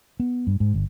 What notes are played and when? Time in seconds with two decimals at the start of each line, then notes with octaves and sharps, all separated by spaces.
0.20 B3
0.47 G2
0.60 G#2
0.74 G1